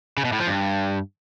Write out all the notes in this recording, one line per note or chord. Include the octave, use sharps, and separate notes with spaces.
C#3
B2
A2
F3
G2